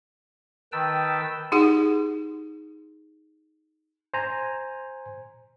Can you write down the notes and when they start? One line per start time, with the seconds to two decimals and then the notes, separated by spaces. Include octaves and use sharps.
0.72 D#3 B4 G5 A5 E6
1.52 D#4 G4 G#4 F#5
4.14 C5 G#5 A#5